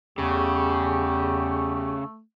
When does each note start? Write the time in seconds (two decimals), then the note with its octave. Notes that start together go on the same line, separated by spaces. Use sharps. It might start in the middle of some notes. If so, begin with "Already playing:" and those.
0.18 E2 C#3 A3 G4